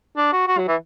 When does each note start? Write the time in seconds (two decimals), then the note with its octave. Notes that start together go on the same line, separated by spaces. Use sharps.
0.17 D4
0.33 F#4
0.48 F#4
0.58 F#3
0.68 E3